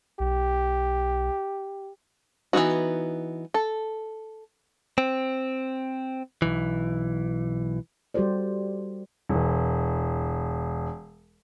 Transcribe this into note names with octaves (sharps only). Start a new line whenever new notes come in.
B1 G4
E3 A#3 B3 D#4 F#4
A4
C4
B1 E3
G3 F#4 G4 A4 C5 D5
E1 E3